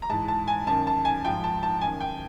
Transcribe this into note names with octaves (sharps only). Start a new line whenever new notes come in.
A#5
G#2 E3 A5
A5
G#5
F#2 D#3 A5
A5
G#5
G#2 F3 G5
A5
A5
F#2 D#3 G#5
G5